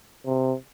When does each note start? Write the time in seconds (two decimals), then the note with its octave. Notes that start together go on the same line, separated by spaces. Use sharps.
0.26 C3